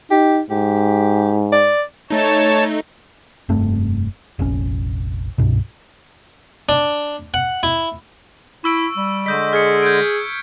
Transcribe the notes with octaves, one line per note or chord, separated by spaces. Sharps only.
D#4 G4
G#2 G4
D5
A3 D#4 C#5 A5
F1 G2 A3 C4
F1 A#1 C#4
C2 G2 B2
D4
F#5
E4
E4 C#6 E6 D7
G3
D3 G#3 D#5 C#6 G6 B6
G#4 F6 C#7
G6 G#6 D7